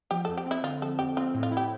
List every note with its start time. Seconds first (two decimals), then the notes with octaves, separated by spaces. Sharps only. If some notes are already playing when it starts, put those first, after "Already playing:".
0.11 F3 G4
0.25 F2 A4
0.38 G4
0.46 C4 E4
0.63 D3 F4
0.82 F3 A4
0.99 F2 G4
1.17 C4 F4
1.35 A2
1.43 F4
1.51 E4
1.57 G4